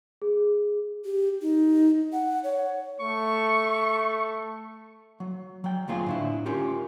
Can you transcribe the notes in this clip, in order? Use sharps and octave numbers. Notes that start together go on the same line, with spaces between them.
G#4
G4
D#4
F#5
C#5
A3 C#6
F#3
F#3 G5
D2 A#2 C4 F4 G#4
A2 D3 E4
C#4 F4 G4 A#4